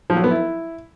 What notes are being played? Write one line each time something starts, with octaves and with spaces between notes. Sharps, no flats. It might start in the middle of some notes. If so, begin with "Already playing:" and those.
F3
F#3
B3
E4